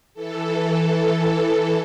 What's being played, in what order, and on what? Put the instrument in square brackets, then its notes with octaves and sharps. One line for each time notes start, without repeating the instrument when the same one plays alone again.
[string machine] E3 A4